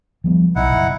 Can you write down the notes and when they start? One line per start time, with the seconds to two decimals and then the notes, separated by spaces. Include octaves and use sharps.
0.24 F3 G3 B3
0.56 B1 D#4 E4 F#5
0.68 F#1